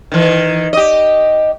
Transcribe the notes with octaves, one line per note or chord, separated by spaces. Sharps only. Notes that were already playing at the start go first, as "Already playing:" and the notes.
D#3 E3
G4 D#5